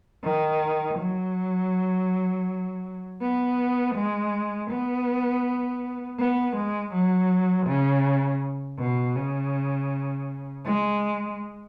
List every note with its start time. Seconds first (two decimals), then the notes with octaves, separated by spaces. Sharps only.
0.24 D#3
0.99 F#3
3.22 B3
3.95 G#3
4.70 B3
6.19 B3
6.56 G#3
6.93 F#3
7.67 C#3
8.80 B2
9.16 C#3
10.65 G#3